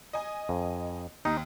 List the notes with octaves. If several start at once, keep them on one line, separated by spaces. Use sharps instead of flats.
D#5 G#5
F2
D#2 D#4